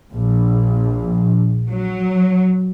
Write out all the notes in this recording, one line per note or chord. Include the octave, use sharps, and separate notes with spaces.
A#1
F#3